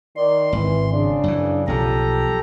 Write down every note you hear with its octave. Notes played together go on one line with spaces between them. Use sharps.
D#3 D5 C6
G#1 E3
C#3 D4
F#2 E3
B1 F3 G4 A4 A#5